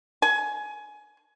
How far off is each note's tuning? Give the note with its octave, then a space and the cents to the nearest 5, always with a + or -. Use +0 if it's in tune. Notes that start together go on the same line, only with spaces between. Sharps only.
G#5 +20